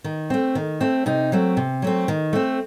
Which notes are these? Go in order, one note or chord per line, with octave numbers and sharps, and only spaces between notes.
D#3
A3 C4
D#3
A3 C4
C3 D#4
F#3 A3 C4
C3
F#3 A3 C4
D#3
A3 C4